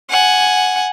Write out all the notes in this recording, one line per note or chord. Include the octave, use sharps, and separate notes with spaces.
F#5 G#5